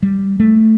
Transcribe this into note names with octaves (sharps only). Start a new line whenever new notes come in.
G3
A3